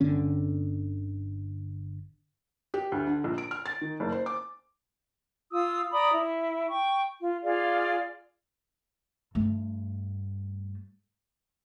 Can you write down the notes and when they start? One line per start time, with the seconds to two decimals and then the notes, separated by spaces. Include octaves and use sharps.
0.01 G1 D3 C#4
2.74 G4
2.92 D2
3.07 D3
3.24 A#1
3.38 D7
3.51 F6
3.66 A6
3.81 D#3
4.00 F#1
4.12 C5
4.26 D6
5.51 F4 D#6 E6
5.91 D5 A#5 B5 D#6
6.12 E4
6.69 G5 C#6
7.20 F4
7.43 F4 G#4 D5 F5
9.35 G2 A3